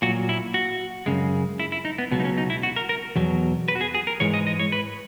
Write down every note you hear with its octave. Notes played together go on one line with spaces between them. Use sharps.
A#2 F#3 F#4
E4
F#4
F#2 C#3 G#3
E4
E4
D#4
B3
C#2 B2 F#3 B3
D#4
C#4
D#4
E4
F#4
A#4
A#4
E2 B2 F#3
B4
F#4
G#4
G#4
A#4
G#2 E3 G#3 C#5
D#5
D#5
C#5
B4